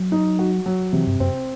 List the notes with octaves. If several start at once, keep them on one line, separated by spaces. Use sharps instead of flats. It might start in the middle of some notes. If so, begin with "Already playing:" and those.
Already playing: F#3
D#4
F#4
F#3
C3 E3
G2
F#2 C4